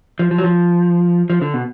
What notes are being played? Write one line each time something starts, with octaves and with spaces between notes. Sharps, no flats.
F3
F3
F#3
F3
F3
D3
B2